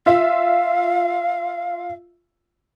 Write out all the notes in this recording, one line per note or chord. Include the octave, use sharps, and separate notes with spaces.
F4 E5 F5